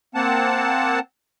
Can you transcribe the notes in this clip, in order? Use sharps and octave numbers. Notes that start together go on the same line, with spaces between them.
A#3 C4 F#5 A5